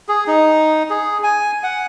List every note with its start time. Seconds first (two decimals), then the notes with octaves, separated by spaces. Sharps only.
0.08 G#4
0.27 D#4
0.90 G#4
1.23 G#5
1.63 F#5